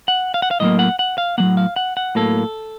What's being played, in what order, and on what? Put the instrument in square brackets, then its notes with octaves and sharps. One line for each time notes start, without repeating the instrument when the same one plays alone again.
[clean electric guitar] F#5
F5
F#5
F5
A2 F#3 A#3 D#5
F#5
F#5
F5
A2 F#3 A#3 F#5
F5
F#5
F#5
A2 F#3 A#3 A4